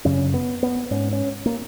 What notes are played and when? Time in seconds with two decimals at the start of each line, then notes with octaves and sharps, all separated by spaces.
0.05 F#2 C#3 C#4
0.34 B3
0.63 B3
0.91 G#2 C#4
1.13 C#4
1.46 A#3